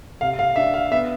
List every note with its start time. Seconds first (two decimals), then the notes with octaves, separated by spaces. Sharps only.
0.21 C3 F5
0.39 F5
0.56 D4 E5
0.74 F5
0.91 B3 E5